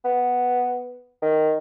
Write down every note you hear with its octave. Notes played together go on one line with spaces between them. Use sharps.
B3
D#3